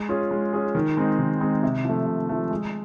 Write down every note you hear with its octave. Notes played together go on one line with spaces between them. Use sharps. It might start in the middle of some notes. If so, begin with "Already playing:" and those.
Already playing: G#3
C#4 F4 G#4
G#3
C#4 F4 G#4
D#3
G#3 C4 D#4
D#3
G#3 C4 D#4
C3
F3 A3
C3
F3 A3
G#3